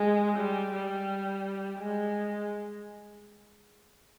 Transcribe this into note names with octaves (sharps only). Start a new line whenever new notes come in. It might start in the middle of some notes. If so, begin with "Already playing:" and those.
Already playing: G#3
G3
G3
G#3